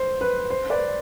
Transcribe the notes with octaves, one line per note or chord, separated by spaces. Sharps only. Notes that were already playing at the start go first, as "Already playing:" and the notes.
Already playing: C5
B4
C5
B4 D5